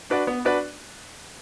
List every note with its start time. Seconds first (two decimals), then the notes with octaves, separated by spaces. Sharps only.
0.10 D4 F#4 B4 D5
0.27 B3
0.45 D4 F#4 B4 D5